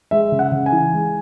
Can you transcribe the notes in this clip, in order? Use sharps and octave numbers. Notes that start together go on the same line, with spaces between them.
G#3 E5
C#3
F#5
C#3
G#5
E3
G#3